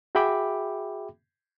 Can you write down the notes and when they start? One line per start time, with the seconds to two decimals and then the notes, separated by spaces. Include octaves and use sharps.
0.15 F#4 G#4 E5 G5 B5 D6